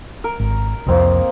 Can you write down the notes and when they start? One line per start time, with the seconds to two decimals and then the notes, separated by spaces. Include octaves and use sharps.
0.24 A#4
0.40 G#1
0.86 C2 F2 A#3 C4 D#5